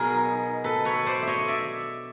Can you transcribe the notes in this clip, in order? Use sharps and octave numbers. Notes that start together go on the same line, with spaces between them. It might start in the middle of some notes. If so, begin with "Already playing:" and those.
Already playing: B2 F#3 B3 D#4 G#4 A#4
A4 B4
B4 C#5
C5 D5
C#5 D#5 E5
D5 E5